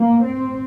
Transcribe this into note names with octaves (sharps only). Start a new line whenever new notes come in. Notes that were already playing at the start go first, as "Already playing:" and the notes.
Already playing: A#3
C4